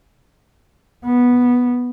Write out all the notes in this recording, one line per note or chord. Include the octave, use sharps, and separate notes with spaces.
B3